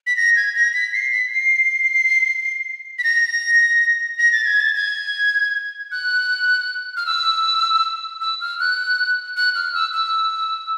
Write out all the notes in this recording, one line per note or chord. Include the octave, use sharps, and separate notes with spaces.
B6
A#6
G#6
A#6
B6
C7
B6
C7
B6
A#6
A#6
A6
G#6
A6
G#6
F#6
F6
E6
E6
F6
F#6
F#6
F6
E6
E6